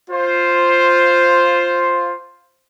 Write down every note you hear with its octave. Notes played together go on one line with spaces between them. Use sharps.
F4 C5